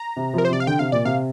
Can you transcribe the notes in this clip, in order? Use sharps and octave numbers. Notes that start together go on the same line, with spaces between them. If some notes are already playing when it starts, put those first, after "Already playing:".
Already playing: A#5
C3
C3 F3 A#4
C5
C3 D5
F5
D3 G5
C3 F5
A#2 D5
C3 F5